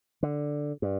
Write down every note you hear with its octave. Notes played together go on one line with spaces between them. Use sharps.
D3
G2